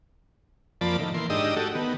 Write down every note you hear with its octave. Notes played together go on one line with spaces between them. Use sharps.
F2 F3 A#3 D5 A5 B5
A2 D#3
E3 A#3 C6
G#2 D4 D#4 G4 D#5 E6
A3 F#4 G4 A4
D#3 B3